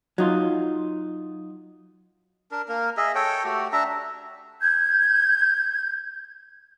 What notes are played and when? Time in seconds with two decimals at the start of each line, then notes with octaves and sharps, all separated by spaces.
0.18 F#3 D#4 F4
2.51 D4 A#4
2.68 A#3 A#4
2.97 G#4 D#5 E5
3.15 A4 C#5 G5
3.44 A3 F#4 G4
3.72 D4 E5 A#5
4.59 G6 G#6